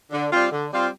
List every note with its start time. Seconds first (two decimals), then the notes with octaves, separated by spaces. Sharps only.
0.12 D3
0.32 G3 C4 F4
0.51 D3
0.72 G3 C4 F4